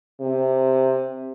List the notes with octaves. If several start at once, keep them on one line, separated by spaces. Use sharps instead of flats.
C3